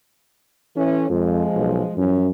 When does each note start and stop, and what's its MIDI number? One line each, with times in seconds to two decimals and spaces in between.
0.76 1.07 52
0.76 1.07 61
0.76 1.07 69
1.10 1.44 41
1.10 1.94 53
1.10 1.94 56
1.55 1.81 35
1.97 2.30 42
1.97 2.29 52
1.97 2.29 53
1.97 2.29 61